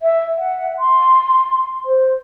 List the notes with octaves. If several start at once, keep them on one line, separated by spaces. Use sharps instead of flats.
E5
F#5
C6
C5